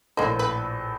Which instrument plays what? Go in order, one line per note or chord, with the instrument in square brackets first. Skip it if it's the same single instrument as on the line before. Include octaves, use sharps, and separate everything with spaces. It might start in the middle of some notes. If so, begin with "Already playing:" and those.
[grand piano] A#1 A2 D#5 [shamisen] A#3 C5
[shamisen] B4